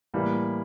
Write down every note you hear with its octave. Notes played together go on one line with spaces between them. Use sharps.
A2 E3 G3 A#3